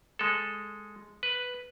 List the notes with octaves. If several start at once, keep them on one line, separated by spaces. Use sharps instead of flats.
G#3 A4
B4